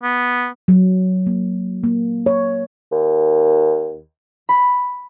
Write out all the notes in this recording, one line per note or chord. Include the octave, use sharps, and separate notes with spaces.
B3
F#3
A#3
A#3
C#5
D#2
B5